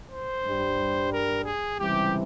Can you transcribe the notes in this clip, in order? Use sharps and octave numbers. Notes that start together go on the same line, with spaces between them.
C5
G2 G3
A#4
G#4
C#2 C3 E3 G3 G4